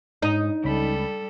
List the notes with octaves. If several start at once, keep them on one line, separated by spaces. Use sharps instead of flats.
G#2 D#4 D#6
C#2 G3 A4 B5